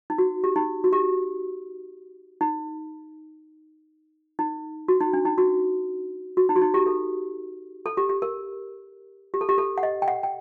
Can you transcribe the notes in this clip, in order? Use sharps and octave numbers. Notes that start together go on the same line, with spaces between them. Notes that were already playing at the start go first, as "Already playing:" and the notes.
D#4
F#4
G4
D#4
F#4
G4
D#4
D#4
F#4
D#4
D4
D#4
F#4
F#4
D#4
F#4
D#4
G4
A4
A4
G4
G4
A#4
G4
A4
G4
A4
F#5
D#5
G5
F#5
G5